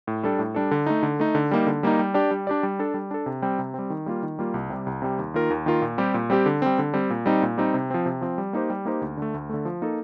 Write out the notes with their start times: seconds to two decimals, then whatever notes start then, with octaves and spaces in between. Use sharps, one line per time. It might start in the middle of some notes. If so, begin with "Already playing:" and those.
0.07 A2
0.23 G3 D4 A4
0.39 A2
0.55 G3 D4 A4
0.71 D3
0.86 A3 D#4
1.03 D3
1.20 A3 D#4
1.35 D3
1.51 G3 A#3 D#4
1.67 D3
1.83 G3 A#3 D#4
1.99 G3
2.14 D4 G4 D5
2.31 G3
2.47 D4 G4 D5
2.63 G3
2.79 D4 A4
2.94 G3
3.11 D4 A4
3.26 C3
3.42 G3 C4
3.59 C3
3.74 G3 C4
3.90 D#3
4.06 G3 A#3 F4
4.23 D#3
4.39 G3 A#3 F4
4.54 C2
4.70 C3 G3
4.86 C2
5.02 C3 G3
5.19 D#2
5.34 D#3 A#3 F4 A#4
5.50 D#2
5.66 D#3 A#3 F4 A#4
5.82 A#2
5.98 G3 C4 G4
6.14 A#2
6.30 G3 C4 G4
6.46 D3
6.62 G3 C4
6.79 D3
6.94 G3 C4
7.10 A#2
7.26 G3 C4 D#4
7.42 A#2
7.58 G3 C4 D#4
7.74 C3
7.90 F3 C4
8.06 C3
8.21 F3 C4
8.38 G3
8.53 A#3 D#4 G4 C5
8.70 G3
8.85 A#3 D#4 G4 C5
9.01 D2
9.17 D3 A3
9.34 D2
9.49 D3 A3
9.65 F3
9.82 A#3 D#4 A4